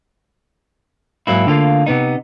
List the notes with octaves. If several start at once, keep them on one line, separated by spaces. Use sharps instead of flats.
G#2 F#3 A#3 E4
D3 A3 A#3 F4
C3 B3 D#4